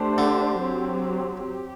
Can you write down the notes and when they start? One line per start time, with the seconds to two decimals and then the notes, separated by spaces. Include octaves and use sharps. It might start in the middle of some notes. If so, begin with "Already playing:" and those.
Already playing: A3 D4 G4 C5
0.18 D3
0.60 F#3 C4 G4
1.45 G4